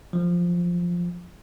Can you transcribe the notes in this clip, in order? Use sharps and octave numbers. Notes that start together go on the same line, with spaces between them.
F3